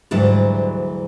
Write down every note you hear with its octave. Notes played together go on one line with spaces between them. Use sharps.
D2 G#2 E3 F#3 G3 D4